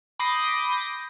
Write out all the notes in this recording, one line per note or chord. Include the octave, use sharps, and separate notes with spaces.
B5 D6 D#6 G6 A#6 C7